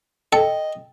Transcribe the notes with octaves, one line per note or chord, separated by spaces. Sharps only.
A4 D#5 G5